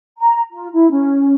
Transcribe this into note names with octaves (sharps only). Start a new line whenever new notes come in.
A#5
F4
E4
C#4